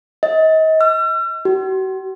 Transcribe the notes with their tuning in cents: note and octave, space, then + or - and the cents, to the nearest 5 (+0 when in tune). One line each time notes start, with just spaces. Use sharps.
D#5 +35
E6 +45
F#4 +45